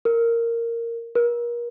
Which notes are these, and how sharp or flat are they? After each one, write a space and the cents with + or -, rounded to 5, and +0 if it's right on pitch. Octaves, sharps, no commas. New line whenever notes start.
A#4 -10
A#4 +35